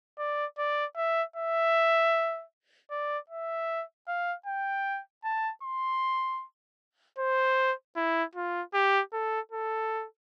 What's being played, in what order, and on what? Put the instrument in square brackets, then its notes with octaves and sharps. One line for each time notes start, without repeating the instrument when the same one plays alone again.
[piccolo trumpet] D5
D5
E5
E5
D5
E5
F5
G5
A5
C6
C5
E4
F4
G4
A4
A4